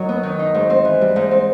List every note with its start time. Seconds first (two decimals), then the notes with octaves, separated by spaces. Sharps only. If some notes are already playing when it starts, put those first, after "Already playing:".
Already playing: F#2 F#3 D#4
0.09 B3
0.23 D#3
0.39 D#4
0.54 G#2
0.70 C4
0.85 E3
1.01 G3
1.16 G#2
1.31 C4